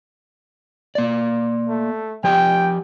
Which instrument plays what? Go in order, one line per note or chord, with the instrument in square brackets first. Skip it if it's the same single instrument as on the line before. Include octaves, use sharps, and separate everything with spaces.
[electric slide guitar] A#3 D5
[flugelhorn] A3
[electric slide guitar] F3 G4 G#5 [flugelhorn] G5